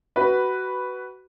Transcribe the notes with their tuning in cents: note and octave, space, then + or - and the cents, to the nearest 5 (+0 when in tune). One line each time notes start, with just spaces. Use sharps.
F#4 +20 B4 +0